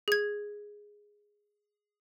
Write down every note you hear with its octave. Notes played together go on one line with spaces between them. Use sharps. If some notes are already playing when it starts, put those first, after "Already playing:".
G#4 G#6